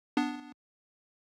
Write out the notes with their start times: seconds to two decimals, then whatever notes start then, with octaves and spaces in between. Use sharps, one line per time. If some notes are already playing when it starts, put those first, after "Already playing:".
0.17 B3 D4